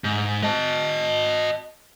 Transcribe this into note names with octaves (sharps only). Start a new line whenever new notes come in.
G#2
D#5 A5